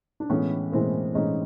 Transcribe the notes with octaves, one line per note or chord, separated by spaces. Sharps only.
D4
A2 E3 G#3 B3 C#4
A2 E3 G#3 A#3 C4
A2 E3 G#3 C#4 D#4